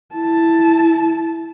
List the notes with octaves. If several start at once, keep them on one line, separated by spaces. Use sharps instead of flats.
E4 A5